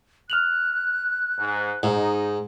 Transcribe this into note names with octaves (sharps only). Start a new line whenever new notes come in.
F6 F#6 F7 F#7
G#2
G#2 D#4